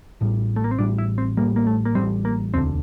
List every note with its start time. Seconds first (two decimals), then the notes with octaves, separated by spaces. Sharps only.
0.21 A1 A2 G3
0.56 A3
0.64 A#3
0.71 C4
0.79 A1 A2 G3 D4
0.98 E4
1.18 C4
1.37 A1 A2 G3 A#3
1.56 A#3
1.67 A3
1.85 A#3
1.95 A1 A2 G3 C4
2.25 A#3
2.54 E1 D2 D3 C4